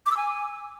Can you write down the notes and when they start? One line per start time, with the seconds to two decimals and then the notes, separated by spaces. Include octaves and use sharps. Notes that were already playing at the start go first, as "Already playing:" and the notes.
0.06 D6
0.12 E6
0.17 G#5